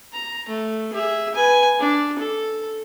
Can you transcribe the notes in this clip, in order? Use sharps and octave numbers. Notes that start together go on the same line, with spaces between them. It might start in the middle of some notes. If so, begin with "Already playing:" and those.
A#5
A3
G#4 E5
B4 G#5
D4
A4